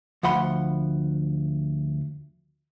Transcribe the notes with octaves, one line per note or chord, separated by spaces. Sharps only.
D2 F3 F#5 B5 C6